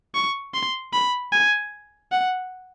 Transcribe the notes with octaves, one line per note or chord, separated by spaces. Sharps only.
C#6
C6
B5
G#5
F#5